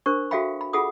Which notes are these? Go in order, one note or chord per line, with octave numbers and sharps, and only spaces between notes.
D4 A#4 C5 C#6
F#4 A4 E5 F5 G5 B5
B5
F4 G#4 A4 F#5 B5 D#6